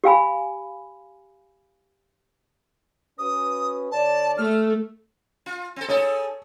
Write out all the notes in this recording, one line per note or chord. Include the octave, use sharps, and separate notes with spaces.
G4 F5 G#5 B5
C#4 F#4 B4 D#6
D3 C#5 D5 A5
A3 F6
F4
C4 A4
D#4 G#4 A4 C#5